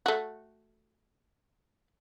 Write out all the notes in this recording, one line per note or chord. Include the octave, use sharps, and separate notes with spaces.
A3 F#4